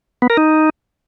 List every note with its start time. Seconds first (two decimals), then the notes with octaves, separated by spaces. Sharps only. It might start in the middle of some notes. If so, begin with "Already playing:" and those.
0.22 B3
0.30 A#4
0.37 D#4